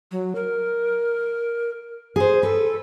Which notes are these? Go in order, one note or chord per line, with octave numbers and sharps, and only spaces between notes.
F#3
A#4
G#4 C5
A4 B4